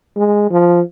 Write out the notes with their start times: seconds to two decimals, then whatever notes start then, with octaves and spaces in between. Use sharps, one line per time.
0.16 G#3
0.51 F3